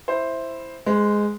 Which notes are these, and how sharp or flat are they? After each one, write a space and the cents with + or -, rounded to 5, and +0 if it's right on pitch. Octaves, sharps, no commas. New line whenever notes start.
E4 +0 C5 +5
G#3 +0 C5 -45